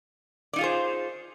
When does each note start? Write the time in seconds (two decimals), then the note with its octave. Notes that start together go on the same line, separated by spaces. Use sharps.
0.53 D5
0.56 D#4
0.58 F4
0.61 G#4
0.64 C5